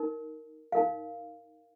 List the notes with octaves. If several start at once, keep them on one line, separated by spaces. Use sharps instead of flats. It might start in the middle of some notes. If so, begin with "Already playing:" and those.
Already playing: D#4 A#4
D#4 A#4 F5